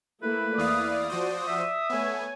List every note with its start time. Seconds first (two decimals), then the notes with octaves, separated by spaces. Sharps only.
0.23 A3 A#3 E4 B4
0.58 E2 E4 D5 F5 D#6
1.10 F3 F#4 C5
1.47 E5
1.90 A3 B3 C#5 G#5